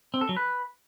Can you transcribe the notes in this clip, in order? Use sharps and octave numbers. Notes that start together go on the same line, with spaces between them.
C4
A4
F#3
B4